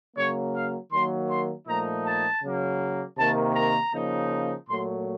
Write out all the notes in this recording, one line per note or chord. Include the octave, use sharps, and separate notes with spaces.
C#3 F#3 A#3 C#5
F5
D#3 F#3 A#3 C6
C6
A#2 F3 A3 D#4 A#5
A5
C#3 F#3 A#3
C3 D#3 A#3 A5
A#5
C#3 F3 A#3 D#4
A#2 F#3 A3 C6